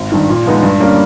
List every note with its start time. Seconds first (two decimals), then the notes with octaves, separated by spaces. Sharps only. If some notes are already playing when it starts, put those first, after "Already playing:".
Already playing: G#1
0.12 G2 D#3
0.29 A#2
0.46 F3 G#3 B3 D#4
0.63 G2
0.80 D3 G3 A#3 C#4